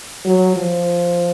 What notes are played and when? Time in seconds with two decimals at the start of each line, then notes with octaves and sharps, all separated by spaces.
0.25 F#3
0.56 F3